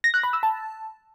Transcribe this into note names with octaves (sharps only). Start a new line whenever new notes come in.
A#6
F#6
B5
E6
A5